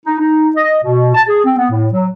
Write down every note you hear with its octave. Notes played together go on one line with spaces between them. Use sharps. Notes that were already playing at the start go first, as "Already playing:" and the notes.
D#4
D#4
D#5
B2
A5
G#4
C4
B3
A2
F#3